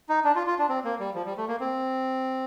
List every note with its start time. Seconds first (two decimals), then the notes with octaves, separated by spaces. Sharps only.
0.09 D#4
0.24 D4
0.36 F4
0.47 F4
0.58 D4
0.69 C4
0.85 A#3
1.00 G3
1.14 F3
1.26 G3
1.37 A3
1.48 A#3
1.60 C4